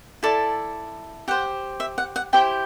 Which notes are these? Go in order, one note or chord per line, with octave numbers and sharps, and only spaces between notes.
E4 A4 D5 A5
G4 C5 F#5
E5
F#5
F#5
E4 G4 C5 G5